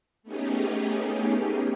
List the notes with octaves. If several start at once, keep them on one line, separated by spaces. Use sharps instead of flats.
A3 B3 C#4 D#4 G4 G#4